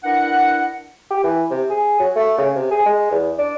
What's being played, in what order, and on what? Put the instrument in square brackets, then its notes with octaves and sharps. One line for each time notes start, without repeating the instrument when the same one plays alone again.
[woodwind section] D4 E4 A#4 B4 F#5
[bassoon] G4
E3
C3
G#4
F#3
A3
C#3
C3
G#4
G#3
E2
D4